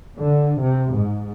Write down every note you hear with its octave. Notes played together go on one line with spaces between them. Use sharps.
D3
C3
G#2